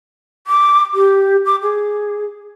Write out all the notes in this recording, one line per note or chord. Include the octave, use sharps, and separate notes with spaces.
D6
G4
D6
G#4